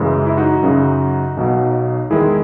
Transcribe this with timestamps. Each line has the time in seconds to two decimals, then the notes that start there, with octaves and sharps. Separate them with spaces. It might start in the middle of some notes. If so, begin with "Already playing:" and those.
Already playing: F#2 C#3 E3 G#3
0.26 E4
0.37 D#4 F#4
0.63 F#2 C#3 F#3
1.37 B1 B2 F#3
2.11 E2 D#3 G#3 E4 G#4